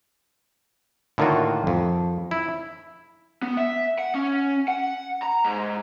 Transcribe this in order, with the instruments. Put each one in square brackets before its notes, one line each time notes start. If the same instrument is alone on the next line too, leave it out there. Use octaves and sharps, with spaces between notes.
[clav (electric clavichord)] A2 D3 D#3 A#3 F4 F#4
F2
E4
[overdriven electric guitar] B3
E5
F#5
C#4
F#5
A#5
G#2